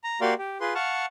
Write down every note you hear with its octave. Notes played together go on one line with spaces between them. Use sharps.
A#5
A#3 F#4 G4 D5 F5 C6
G4
F4 G#4 B4 C6
F5 F#5 A5 C#6 F6